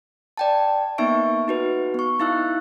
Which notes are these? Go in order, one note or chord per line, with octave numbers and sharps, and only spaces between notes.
D5 G5 A5
A#3 B3 D#4 E5 C#6 D7
D#4 F#4 B4
B3 C#6
D#4 E4 F5 E6 F#6